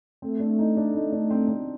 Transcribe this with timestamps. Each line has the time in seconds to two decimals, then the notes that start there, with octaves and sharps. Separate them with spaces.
0.22 A3 C4
0.40 D4
0.59 D#4
0.77 D4
0.95 D#4
1.12 D4
1.30 C4
1.48 C4